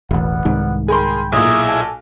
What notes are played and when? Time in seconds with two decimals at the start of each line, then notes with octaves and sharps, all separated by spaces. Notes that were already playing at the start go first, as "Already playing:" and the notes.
0.11 E1 A1 G3 B3 F#5
0.45 C2 G#2 D#3
0.88 G#4 A#4 G5 B5 C6
1.32 B1 A#2 D#4 E4 G#4 D#6
1.67 A4 G#5 A5